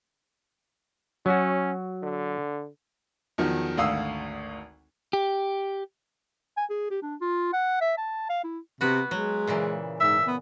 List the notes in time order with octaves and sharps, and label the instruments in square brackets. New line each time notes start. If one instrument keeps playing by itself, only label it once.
[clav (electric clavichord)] F#3 F#4 [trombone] C#4
[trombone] D3
[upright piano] E2 D#3 F3 F#3
G#1 D2 F5 D#6 E6
[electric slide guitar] G4
[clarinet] G#5
G#4
G4
D4
F4
F#5
E5
A5
F5
E4
[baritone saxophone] C3 [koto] B3 F#4
[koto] F#3 [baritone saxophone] G#3
[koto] A#2 C#3 E3
[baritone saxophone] G#2 [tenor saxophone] E5
[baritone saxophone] B3